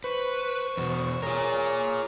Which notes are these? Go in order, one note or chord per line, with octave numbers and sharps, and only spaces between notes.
B4 C5 C#6
E2 B2
F4 G#4 A#4 C#5 A#5